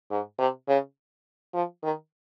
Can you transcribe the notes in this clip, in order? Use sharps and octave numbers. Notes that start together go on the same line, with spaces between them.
G#2
C3
C#3
F3
D#3